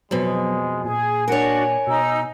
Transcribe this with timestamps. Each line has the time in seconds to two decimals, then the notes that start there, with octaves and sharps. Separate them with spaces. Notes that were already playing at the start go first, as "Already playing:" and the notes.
0.11 F2 B2 F#3 G#3
0.85 A#2 G#4 G#5
1.28 D4 F#4 A#4 C#5
1.87 B2 D#4 E6